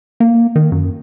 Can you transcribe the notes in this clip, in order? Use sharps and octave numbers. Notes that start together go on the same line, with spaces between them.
A#3
D#3
F#2